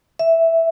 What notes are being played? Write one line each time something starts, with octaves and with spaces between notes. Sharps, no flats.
E5